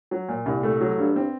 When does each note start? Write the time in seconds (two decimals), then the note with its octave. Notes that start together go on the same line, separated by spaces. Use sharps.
0.11 F#3
0.29 A#2
0.46 C2
0.63 A3
0.81 F#3
0.98 G2
1.16 C4